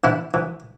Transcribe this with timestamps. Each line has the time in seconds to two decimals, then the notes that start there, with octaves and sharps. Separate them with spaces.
0.04 E3 E4
0.34 E3